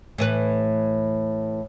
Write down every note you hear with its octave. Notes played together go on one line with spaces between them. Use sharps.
A2 E3 B4